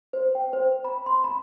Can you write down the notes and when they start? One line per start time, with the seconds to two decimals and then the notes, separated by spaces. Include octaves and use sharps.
0.13 C5
0.35 G5
0.53 C5
0.84 B5
1.06 C6
1.24 B5